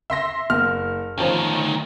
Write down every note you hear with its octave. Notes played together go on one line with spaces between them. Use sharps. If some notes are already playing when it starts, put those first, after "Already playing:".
E5 C6 A#6
F#1 F6
D2 D#3 F3 C#4